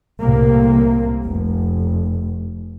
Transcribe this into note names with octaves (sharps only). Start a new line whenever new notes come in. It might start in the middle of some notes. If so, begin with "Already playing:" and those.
C2 A2 C3 A#3
F1